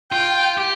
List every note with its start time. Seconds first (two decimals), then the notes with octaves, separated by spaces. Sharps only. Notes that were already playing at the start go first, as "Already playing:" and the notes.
0.12 F4 G5
0.58 G4